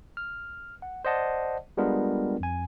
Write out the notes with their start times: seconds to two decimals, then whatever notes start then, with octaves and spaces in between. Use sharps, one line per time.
0.17 F6
0.82 F#5
1.05 C5 D5 D#5 F#5 A5
1.77 G3 G#3 B3 D4 F4 A#4
2.40 F2 G#5